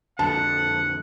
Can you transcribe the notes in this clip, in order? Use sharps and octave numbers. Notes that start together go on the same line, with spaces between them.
F2 D3 F#5 A5